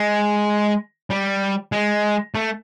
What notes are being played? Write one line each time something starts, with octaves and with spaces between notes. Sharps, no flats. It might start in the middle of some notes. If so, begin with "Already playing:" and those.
Already playing: G#3
G3
G#3
A3